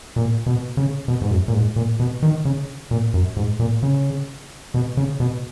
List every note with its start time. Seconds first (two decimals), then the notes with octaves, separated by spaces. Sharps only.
0.16 A#2
0.46 B2
0.77 C#3
1.08 B2
1.22 G#2
1.31 F#2
1.48 A#2
1.53 G#2
1.76 A#2
2.00 B2
2.23 D#3
2.45 C#3
2.91 A#2
3.14 F#2
3.37 G#2
3.60 A#2
3.83 C#3
4.74 B2
4.97 C#3
5.20 B2